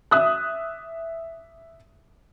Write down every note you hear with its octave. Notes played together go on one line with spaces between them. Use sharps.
E5 D#6 F#6